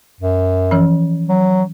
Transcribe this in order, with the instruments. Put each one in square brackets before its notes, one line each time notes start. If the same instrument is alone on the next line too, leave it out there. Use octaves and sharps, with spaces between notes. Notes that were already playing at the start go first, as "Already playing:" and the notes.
[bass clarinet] F#2
[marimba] E3 F3 C#4
[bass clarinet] F#3